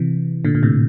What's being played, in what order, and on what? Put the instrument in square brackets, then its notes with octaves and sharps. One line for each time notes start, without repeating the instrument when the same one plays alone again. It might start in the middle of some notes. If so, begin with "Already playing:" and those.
Already playing: [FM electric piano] C3 E3
A#2 D3
A#2
A2 C3